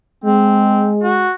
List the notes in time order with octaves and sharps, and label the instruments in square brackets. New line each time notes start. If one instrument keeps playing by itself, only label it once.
[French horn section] G#3 [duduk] C4
[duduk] F#4